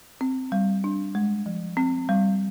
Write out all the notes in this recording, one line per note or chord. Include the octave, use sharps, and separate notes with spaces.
C4
G3
D4
G#3
F3
C4
G3